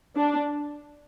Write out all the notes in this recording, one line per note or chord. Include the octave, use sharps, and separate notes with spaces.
D4